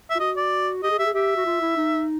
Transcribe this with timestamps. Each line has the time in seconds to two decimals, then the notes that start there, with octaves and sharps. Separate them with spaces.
0.10 E5
0.15 F4
0.20 F#4 D#5
0.37 D5
0.83 G4 D#5
0.91 G#4
0.99 G4 E5
1.06 G#4
1.14 G4 E5
1.37 F#4
1.46 F4
1.62 E4
1.77 D#4